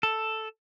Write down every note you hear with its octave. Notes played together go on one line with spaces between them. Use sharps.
A4